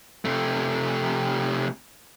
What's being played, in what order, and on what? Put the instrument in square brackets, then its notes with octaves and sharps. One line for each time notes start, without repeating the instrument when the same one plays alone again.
[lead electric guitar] C3 A3